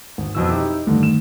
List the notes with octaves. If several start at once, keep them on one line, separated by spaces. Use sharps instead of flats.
G#1
F2 B2 E3 E6
D#4 E4 G4
G2 D3 D#3 A3
E7